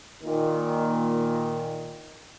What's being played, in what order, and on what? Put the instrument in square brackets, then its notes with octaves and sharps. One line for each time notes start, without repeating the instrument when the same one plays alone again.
[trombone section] A#2 D#3